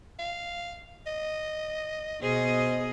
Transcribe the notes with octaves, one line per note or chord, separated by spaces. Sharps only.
F5
D#5
B2 G#4 C5 D#5